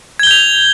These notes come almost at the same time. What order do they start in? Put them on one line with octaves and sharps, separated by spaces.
G#6 G7 G6 F7